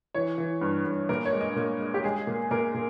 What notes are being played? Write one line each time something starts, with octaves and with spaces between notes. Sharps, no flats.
E3 C#5
E3
G2
G2
A#2 A#4
C#5
G#3
D#5
A#2
G#3
G4
G#3 G#4
A#2
A#2 A#4
A#2